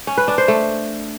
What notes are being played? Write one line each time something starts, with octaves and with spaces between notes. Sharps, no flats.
C#4
B4
D4
C5
A3